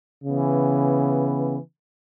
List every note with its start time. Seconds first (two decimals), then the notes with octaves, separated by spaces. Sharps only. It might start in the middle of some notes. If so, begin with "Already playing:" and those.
0.24 C#3 E3 B3